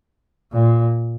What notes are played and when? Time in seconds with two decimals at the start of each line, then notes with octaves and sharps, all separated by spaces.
0.53 A#2